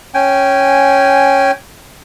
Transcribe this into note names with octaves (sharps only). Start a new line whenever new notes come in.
C#4 G5 G#5